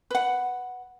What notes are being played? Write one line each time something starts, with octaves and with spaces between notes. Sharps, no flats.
B4 F#5